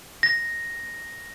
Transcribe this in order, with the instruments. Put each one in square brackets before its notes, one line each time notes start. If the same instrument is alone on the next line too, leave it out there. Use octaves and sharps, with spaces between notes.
[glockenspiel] A#6